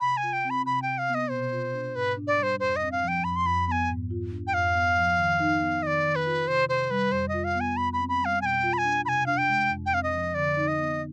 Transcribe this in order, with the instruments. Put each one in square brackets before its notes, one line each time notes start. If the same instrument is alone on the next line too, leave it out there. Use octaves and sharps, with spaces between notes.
[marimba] C3 [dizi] B5
[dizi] G#5
[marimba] F4
[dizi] G5
[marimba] C4
[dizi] B5
[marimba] C3 [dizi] B5
[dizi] G5
[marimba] C3
[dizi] F5
[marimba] B3
[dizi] D#5
[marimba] B2 [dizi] C5
[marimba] F4
D4
[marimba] G#2 [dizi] B4
[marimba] D4
[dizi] D5
[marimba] G3 [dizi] C5
[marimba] F2 [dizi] C5
[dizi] D#5
[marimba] C4
[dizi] F5
[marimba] F3
[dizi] G5
[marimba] F2 [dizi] B5
[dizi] C6
[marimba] F2 [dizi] B5
[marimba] B3 [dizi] G#5 B5
[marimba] G#2
F4
D4
[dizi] G5
[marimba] F2 [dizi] F5
[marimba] B3
F3
D#3
D#4
B3
[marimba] D#3 [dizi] D#5
[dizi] D5
[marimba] D#3
[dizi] B4
[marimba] F4
[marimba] C3 [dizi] C5
[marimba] C3 [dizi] C5
[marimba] G3 [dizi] B4
[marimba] F2 [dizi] C5
[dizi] D#5
[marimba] F4
[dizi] F5
[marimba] B3
[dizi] G#5
[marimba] F2 [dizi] B5
[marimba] C4 [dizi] B5
[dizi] B5
[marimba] G3
[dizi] F5
[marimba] B2 [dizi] G#5
[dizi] G5
[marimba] F4
[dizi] B5
G#5
[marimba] D4
[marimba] C3 [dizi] G#5 B5
[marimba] D4 [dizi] F5
[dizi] G5
[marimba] G#3
F2
[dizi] G5
[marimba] C4 [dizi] F5
[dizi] D#5
[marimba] F3
[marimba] D3 [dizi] D5
[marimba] D#4
[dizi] D#5
[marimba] B3